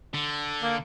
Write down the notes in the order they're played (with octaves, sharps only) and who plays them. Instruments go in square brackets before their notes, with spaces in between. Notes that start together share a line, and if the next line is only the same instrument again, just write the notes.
[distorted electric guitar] D3
[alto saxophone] A#3